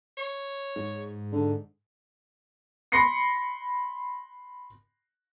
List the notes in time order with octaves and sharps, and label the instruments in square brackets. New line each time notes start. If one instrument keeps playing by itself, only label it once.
[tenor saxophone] C#5
[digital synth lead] G#2
[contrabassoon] D3
[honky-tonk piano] B5 C6 A#6 C7 C#7